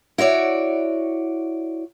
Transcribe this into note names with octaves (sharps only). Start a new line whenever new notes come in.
E4 F#4 C#5 D5